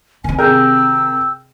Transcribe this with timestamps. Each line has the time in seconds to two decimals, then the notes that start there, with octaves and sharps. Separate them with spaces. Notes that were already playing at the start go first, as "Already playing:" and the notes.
0.24 D#3 C4 G#5
0.38 C3 G#4 A#4 G5 E6 G6